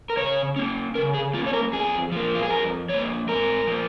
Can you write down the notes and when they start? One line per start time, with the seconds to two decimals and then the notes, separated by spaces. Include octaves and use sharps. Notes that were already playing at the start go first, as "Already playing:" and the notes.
0.10 A#4
0.17 C#3 C#5
0.56 A#3 C#4
0.95 C#3 A#4
1.14 G#4
1.34 A#3 F4
1.37 C#4
1.47 C#5
1.53 A#4
1.73 F2 G#4
2.12 F3 A#3
2.35 F4
2.43 G#4
2.51 F2 A#4
2.89 F3 A#3 C#5
3.28 G#2 A#4
3.67 F3 A#3